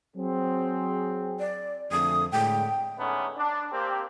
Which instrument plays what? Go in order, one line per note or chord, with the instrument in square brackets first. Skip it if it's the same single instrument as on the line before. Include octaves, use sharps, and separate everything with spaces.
[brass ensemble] F#3 C4 G#4
[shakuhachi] D5
[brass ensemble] F2 D3 A3 [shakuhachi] D#6
[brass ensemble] A2 D3 G#3 [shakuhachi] G5
[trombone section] D3 G#3 A3 B3 C#4 D#4
D4
A#3 C4 G4